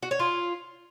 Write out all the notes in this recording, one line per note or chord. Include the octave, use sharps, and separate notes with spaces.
F#4
C#5
F4